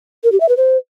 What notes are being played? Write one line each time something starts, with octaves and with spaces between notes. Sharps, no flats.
A#4
G4
E5
B4
C5